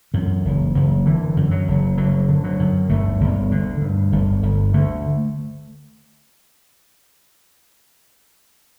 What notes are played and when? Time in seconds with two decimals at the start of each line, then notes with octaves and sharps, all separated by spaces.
0.14 F#2 E3
0.45 F#1
0.75 F#1
1.06 D3 E3
1.37 F#2
1.51 F#3
1.68 F#1
1.98 F#1 F#3
2.29 D3
2.44 F#3
2.59 F#2
2.89 G1 A3
3.21 G1
3.52 D3
3.81 G2
4.12 G1
4.43 G1
4.74 D3 A3